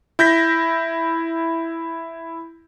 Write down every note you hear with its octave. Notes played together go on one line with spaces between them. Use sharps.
E4 G6 A#6 B6